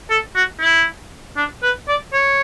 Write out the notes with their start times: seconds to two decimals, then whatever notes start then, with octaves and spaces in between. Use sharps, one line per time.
0.10 A4
0.35 F#4
0.61 E4
1.37 D4
1.63 B4
1.88 D5
2.13 C#5